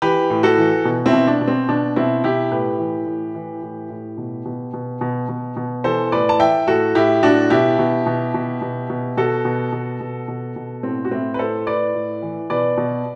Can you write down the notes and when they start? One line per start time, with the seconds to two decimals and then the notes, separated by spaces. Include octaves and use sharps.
0.02 E3 G4 B4
0.30 A2
0.43 F#4 A4
0.58 E3
0.85 B2
1.06 C4 E4
1.13 B2
1.27 D4
1.41 B2
1.47 C4
1.69 B2 D4
1.96 B2 C4 E4
2.24 B2 E4 G4
2.51 A2 G4 B4
2.79 E3
3.06 A2
3.35 E3
3.63 A2
3.90 A2
4.18 B2
4.45 B2
4.74 B2
5.01 B2
5.29 B2
5.57 B2
5.84 E3 A4 C5
6.12 A2 B4 D5
6.29 A5
6.40 E3 E5 G5
6.67 A2 F#4 A4
6.95 A2 E4 G4
7.23 A2 D4 F#4
7.50 B2 E4 G4
7.79 B2
8.06 B2
8.34 B2
8.62 B2
8.90 B2
9.17 B2 F#4 A4
9.45 B2
9.72 B2
10.01 B2
10.28 B2
10.56 B2
10.83 A2 C4
11.05 F#4
11.11 A2 C4 E4
11.34 B4
11.39 A2 A4 C5
11.67 A2 B4 D5
11.95 A2
12.22 E3
12.50 B2 B4 D5
12.78 B2